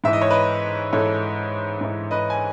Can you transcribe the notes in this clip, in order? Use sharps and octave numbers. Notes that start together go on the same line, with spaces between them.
G#2 E3 E5
D#5
C#5
B4 D#5
G#2 E3 A4 C#5
G#2 E3
B4 D#5
G#5